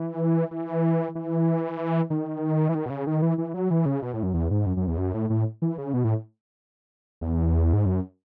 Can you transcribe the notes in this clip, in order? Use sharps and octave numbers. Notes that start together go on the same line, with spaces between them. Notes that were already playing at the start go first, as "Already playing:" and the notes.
Already playing: E3
E3
E3
D#3
E3
D#3
B2
C#3
D#3
E3
E3
F#3
E3
C#3
B2
A2
F#2
E2
G#2
F#2
F#2
E2
F#2
A2
A2
E3
C#3
B2
A2
E2
G#2
F#2